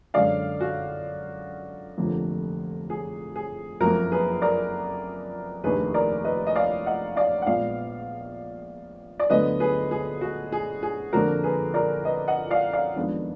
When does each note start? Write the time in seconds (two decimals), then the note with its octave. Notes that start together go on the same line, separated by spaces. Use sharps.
0.14 F#2 D3 G#3 D5 F5
0.61 F#4
1.98 F1 F2 D3 F3 A#3
2.90 G#4
3.36 G#4
3.81 F#1 F2 F3 A#3 F#4 A#4
4.11 G#4 B4
4.42 A#4 D5
5.64 F1 D#2 D#3 A#3 D4 G#4 B4
5.94 A#4 D5
6.24 B4 D#5
6.47 D#5
6.55 D5 F5
6.86 D#5 F#5
7.16 D5 F5
7.42 F#5
7.46 A#1 A#2 G#3 B3 D5 F5
9.19 D5
9.30 D2 D3 F#3 B3 D4 B4 D#5
9.60 G#4 B4
9.91 G#4
10.21 F#4
10.52 G#4
10.83 G#4
11.13 F2 D3 F3 A#3 D4 F#4 A#4
11.44 G#4 B4
11.74 A#4 D5
12.05 B4 D#5
12.27 D#5 F#5
12.51 D5 F5
12.73 D5 F5
12.96 F2 D#3 G#3 B3 D4